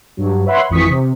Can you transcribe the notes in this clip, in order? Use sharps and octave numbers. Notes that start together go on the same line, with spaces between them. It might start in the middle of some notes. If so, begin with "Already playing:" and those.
G2 F#3
B4 C#5 E5 F#5 B5 C6
G#1 F2 E3 C#6 D#6 B6
C3